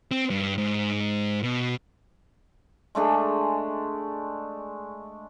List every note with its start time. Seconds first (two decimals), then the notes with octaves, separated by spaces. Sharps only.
0.11 C4
0.30 G2
0.58 G#2
1.43 B2
2.95 G#3 A3 D4 G#4